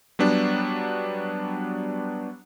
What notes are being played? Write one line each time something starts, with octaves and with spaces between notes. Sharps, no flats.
F#3 G3 B3 D4